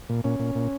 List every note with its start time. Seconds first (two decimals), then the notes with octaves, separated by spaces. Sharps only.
0.09 A#2
0.24 A#2 C#4
0.39 A#2
0.55 A#2